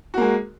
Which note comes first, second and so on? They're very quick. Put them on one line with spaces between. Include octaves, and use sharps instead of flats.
F#4 A#3 G#3